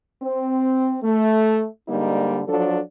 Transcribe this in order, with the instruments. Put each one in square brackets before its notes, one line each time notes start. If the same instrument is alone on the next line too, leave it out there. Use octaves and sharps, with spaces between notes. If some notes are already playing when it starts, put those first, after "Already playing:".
[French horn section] C4
A3
G#2 D3 G3 A#3 D#4
F3 F#3 D4 A4